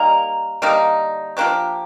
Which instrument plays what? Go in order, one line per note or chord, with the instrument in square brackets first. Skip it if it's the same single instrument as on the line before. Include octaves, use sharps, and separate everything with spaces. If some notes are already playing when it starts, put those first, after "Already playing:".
Already playing: [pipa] G3 A#3 D#4 A#4
D3 G3 A#3 D#4
F3 A#3 D4 G4